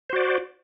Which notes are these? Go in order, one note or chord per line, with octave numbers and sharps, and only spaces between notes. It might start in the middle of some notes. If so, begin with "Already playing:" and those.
F#4 C5 D5